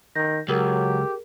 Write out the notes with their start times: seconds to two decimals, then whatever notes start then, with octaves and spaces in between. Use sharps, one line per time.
0.15 D#3 G6 A#6
0.48 C#2 F#3 G4 G#4 A#4